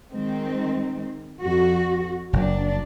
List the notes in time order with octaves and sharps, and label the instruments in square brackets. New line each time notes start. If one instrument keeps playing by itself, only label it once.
[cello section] D#3 G#3 C4
F2 F#4
[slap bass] F#1 [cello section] F#3 D4